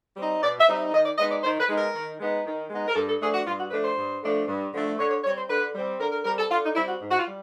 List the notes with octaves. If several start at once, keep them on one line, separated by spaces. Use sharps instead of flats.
G3 C4 D#4
B2 D5
E5
G3 C4 D#4
E5
D#3 D#5
D5
G#3 B3 D#4 D#5
D5
D#3 C5
B4
G#3 B3 D#4
A#4
D#3
G#3 B3 D#4
D#3
G#3 B3 D#4
A#4
G2 A4
A4
D3 F3 A3 D4 G#4
F#4
G2 F4
F#4
D3 F3 A3 D4 B4
C5
G2
D3 F3 A3 D4
G2
D3 F3 A3 D4
D3 C#5
C#5
G3 C4 C#5
C5
D3 B4
G3 C4
D3 A#4
A#4
G3 C4 A#4
A4
D3 F4
D#4
G3 C4 E4
F#4
G#2
F#4
F4
G3